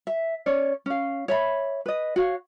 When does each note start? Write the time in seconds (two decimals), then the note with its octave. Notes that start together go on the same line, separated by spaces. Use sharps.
0.07 E5
0.46 C#4 C#5 D5
0.86 C#4 F5
1.28 C#5 E5 B5
1.86 B4 D#5
2.16 F#4 C#5 F5